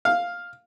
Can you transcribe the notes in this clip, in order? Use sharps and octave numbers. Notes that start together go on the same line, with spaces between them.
F5